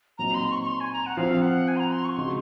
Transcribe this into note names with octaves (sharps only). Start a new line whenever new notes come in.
A#2 F#3 C4 D#4 A#5
C6
C#6
C#6
C6
G#5
A#5
F#5
F3 C4 F4 F5
F#5
G#5
C6
A#5
C6
C#6
C#3 G#3 D#4 F#4 C6